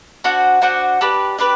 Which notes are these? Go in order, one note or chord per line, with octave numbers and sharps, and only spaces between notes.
D4 F#4 C5 F#5
D4 F#4 C5 F#5
D4 G4 B4
D4 G4 B4